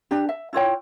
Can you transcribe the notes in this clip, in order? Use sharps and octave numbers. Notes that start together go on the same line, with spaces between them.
D4 G4
E5
E4 F4 C#5 G5